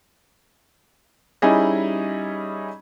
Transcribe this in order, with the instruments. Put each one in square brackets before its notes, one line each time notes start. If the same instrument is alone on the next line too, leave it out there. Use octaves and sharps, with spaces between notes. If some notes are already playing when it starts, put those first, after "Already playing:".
[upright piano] G3 C#4 D#4 E4 G#4 D#5